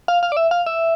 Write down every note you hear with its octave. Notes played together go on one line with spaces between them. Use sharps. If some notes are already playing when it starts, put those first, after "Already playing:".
F5
F5
D5
E5
F5
E5